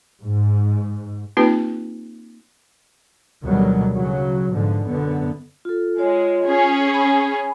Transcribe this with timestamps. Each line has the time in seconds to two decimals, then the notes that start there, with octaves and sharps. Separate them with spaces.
0.23 G#2
1.37 A#3 C4 D#4 F4 G4 B4
3.44 D2 B2 D#3 F#3 G3
3.93 C#3 F#3
4.51 G#2 B2 D3 F3
4.87 F#2 D3 B3
5.65 F4 A4
5.98 G#3 F4 C#5
6.45 C#4 G#4
6.90 G#5 B5